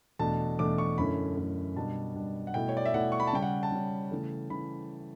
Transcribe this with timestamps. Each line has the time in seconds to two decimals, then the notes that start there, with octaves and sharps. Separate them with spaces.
0.19 E2 B2 A3 D4 A5
0.59 E2 B2 A3 D4 D6
0.78 C#6
0.98 F#2 D3 A3 C#4 E4 B5
1.37 F#2 D3 A3 C#4 E4
1.76 B2 G3 D4 A5
2.15 B2 G3 D4
2.47 F#5
2.54 B2 A3 E4 G5
2.69 C#5
2.77 D5
2.85 E5
2.94 B2 A3 E4 F#5
3.12 C#6
3.20 B5
3.27 A5
3.33 C#3 G3 C#4 G5
3.42 F#5
3.63 A5
3.72 C#3 G3 C#4
4.11 C#3 E3 A3
4.50 C#3 E3 B5